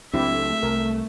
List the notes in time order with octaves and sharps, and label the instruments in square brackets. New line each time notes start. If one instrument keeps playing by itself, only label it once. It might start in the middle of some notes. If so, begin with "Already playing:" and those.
[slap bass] C#2 F#3 D4 [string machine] A3 [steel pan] C4 E4 G4 [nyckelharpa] E5
[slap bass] C2 [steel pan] A#4